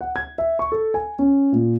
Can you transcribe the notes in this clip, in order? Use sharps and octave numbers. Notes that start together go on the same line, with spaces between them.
F#5
G#6
E5
C#6
A4
G#5
C#4
A#2